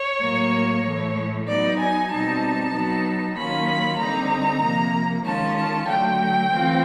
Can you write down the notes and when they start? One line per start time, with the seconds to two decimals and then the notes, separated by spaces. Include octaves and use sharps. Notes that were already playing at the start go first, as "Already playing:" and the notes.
Already playing: C#5
0.21 A2 F#3 A#3
0.84 A2 E3 A3
1.47 F#3 B3 D#4 D5
1.79 G#5
2.10 B2 G3 C4 D#4 A5
2.73 F#3 B3 D#4
3.35 D#3 F#3 A#3 C#4 F4 B5
3.99 D3 G3 C4 D#4 A#5
4.62 C3 F3 A#3
5.24 D#3 G#3 C#4 F4 A5
5.87 D3 F#3 A3 G5
6.51 E3 A3 C4 F4